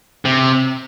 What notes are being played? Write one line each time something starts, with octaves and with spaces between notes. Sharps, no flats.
C3